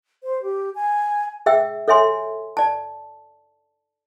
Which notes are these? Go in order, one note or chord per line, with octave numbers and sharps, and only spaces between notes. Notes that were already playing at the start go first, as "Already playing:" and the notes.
C5
G4
G#5
G#4 E5 G5 E6
A4 C#5 E5 G#5 C6
D5 A5